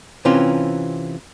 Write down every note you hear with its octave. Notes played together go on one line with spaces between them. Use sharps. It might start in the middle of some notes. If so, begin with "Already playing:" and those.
C3 E3 C4 C#4 F4